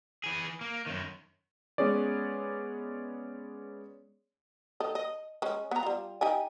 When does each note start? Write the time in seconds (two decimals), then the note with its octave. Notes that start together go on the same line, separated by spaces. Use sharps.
0.24 E3 G#4
0.61 A#3
0.87 F#2 D#3
1.78 G#3 B3 C#4 G#4 C#5 D5
4.80 D#3 A4 D#5
4.95 D#5
5.42 G#3 C#4
5.71 B3 A#5
5.83 G3 F4
6.21 D#4 G4 G#5